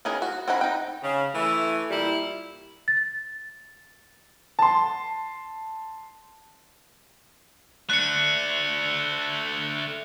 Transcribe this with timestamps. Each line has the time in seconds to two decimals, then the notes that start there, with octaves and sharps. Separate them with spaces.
0.05 D#3 C#4 G#4 A#4 B4
0.22 F#4
0.48 C4 C#4 D#4 F#5 B5
0.61 D#4 G5
1.03 C#3
1.35 E3 A3
1.90 A#2 G3 E4
2.88 A6
4.59 A5 C6
7.90 A3 D4 F#6 C#7